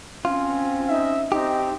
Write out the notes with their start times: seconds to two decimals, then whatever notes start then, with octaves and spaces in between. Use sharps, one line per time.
0.25 C4 C#4 F4
0.89 D#4 E5
1.32 C4 D#4 G4